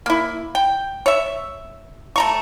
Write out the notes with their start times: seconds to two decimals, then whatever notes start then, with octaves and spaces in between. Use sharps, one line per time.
0.06 A#3 E4
0.55 G5
1.06 C#5 E5
2.16 A3 A#5 C#6